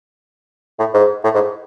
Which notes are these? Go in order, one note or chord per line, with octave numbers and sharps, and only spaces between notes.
A2
G#2
A2
G#2